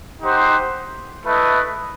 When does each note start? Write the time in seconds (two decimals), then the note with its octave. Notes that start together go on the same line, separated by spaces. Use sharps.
0.21 D#4 G4 C5 F#5
1.23 A3 E4 B4 D#5